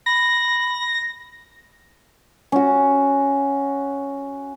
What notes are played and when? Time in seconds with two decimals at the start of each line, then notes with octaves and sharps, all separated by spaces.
0.06 B5 A#6
2.52 C#4 F#4